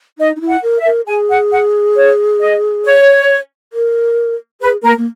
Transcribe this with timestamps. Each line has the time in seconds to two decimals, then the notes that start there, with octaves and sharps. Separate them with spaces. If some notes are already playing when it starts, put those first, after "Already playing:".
0.19 D#4 D#5
0.36 D#4
0.41 E4
0.49 F#5
0.63 A#4
0.78 E5
0.86 A#4
1.07 G#4 G#5
1.30 F#5
1.52 F#5
1.96 C#5
2.40 D#5
2.84 C#5
3.73 A#4
4.61 G#4 B4
4.83 A#3 A#4
4.98 A#3